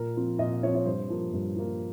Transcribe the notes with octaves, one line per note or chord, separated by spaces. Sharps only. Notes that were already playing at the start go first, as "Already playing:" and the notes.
Already playing: A#2 A#4
F3 C4
A#2 D#5
F3 C4 C#5
C#5
G2 C5
F3 A#3
G2
F3 A#3